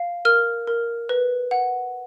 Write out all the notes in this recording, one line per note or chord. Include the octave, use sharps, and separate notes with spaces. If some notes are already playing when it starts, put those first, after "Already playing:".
Already playing: F5
A#4 F6
A#4
B4
F#5